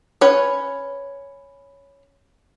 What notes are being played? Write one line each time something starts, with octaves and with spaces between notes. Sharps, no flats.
C#4 B4 C#5